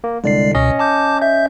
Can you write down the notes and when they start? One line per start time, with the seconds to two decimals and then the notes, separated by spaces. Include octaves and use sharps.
0.04 A#3
0.24 C2 D3 G#3 D5 C7
0.55 C#2 B2 C#4 D#5
0.79 A5 D6 G6
1.21 E5 G6